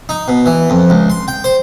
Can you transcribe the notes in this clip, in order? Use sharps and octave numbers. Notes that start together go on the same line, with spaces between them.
D#4
B2
E3
F2
C#2
C6
G5
C5